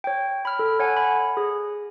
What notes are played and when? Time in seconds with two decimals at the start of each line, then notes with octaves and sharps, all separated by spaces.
0.04 C#5 G5
0.45 B5 F6
0.59 A4
0.80 C#5 F#5 G#5
0.97 B5
1.37 G#4